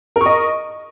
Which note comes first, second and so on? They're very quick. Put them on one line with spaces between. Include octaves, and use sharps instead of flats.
A#4 C#6 D#5